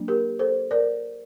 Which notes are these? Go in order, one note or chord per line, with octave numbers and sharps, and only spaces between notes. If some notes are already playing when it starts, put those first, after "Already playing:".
Already playing: F#3 A#3 D4
G4 A#4
A4 C5
A#4 D5